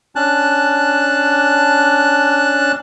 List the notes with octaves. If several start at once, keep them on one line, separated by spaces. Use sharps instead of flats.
C#4 D4 A5 F#6